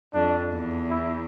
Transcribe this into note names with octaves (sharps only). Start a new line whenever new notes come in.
F2 D4
E2
E4